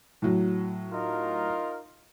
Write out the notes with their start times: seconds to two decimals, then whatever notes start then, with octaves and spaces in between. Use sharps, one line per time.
0.22 A2 F#3
0.92 D#4 F4 A#4